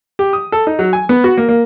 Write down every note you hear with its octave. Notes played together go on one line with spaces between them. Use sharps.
G4
D#6
A4
D#4
F#3
G#5
B3
F#4
A#3
A#3